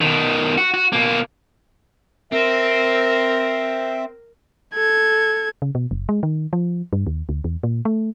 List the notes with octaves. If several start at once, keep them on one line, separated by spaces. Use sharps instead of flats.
B2 D#3
F#4
F#4
B2 A#3
C4 A#4 E5
A4 G#6
C#3
B2
F#1
G#3
D#3
F3
G2
D#2
D2
E2
A#2
A3